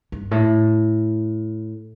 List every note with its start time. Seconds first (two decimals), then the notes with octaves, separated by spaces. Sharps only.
0.12 G2
0.31 A2